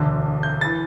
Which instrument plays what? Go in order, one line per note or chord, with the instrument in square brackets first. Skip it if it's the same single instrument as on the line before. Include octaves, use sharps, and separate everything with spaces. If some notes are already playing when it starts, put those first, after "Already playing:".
Already playing: [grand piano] E1 D2 D3
G6
E3 A6